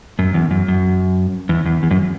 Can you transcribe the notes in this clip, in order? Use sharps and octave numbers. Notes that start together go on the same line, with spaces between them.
F#2
E2
F#2
F#2
E2
E2
E2
F#2